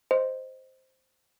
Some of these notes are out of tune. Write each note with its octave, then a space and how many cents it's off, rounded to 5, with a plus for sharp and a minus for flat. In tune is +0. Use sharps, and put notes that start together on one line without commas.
C5 +0 D#5 +0